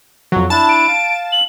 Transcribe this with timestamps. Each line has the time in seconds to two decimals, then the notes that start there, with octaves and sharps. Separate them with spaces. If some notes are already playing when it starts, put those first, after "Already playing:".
0.32 F2 F#3
0.50 D4 E4 A5
0.69 D7
0.88 F5
1.32 F#7